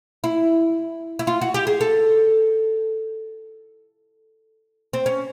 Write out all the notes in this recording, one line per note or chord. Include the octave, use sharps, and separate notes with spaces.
E4
E4
F4
F#4
G4
G#4
A4
C4
C#4